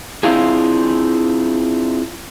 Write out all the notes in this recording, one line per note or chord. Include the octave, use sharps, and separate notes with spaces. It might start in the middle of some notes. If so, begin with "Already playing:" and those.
C4 D4 E4 F4 G#4